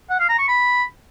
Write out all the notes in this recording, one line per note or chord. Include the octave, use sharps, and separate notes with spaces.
F#5
F5
A#5
C#6
B5